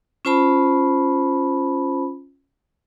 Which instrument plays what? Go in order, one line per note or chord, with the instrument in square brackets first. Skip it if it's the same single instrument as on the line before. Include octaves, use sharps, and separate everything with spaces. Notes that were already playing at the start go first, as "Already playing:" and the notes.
[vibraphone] C#4 F4 C5 A5 B5